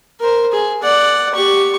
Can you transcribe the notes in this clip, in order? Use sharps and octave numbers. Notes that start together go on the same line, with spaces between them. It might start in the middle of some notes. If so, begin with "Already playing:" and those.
A#4 C5
G#4
D5 F#5
G4 C#6